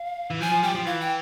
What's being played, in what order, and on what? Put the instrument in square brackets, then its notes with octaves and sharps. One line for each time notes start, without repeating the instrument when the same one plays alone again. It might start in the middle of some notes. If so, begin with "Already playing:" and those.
Already playing: [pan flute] F5
[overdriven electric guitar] E3
[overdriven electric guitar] F3 [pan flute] G#5
[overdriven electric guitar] F3
[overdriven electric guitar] G3 [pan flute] G5
[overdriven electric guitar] F3
[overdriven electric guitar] E3 [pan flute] F5
[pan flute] G5